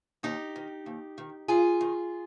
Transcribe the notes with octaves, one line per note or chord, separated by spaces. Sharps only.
D#2 D#4 G4
D#3
D#2
D#3
D#2 F4 G#4
D#3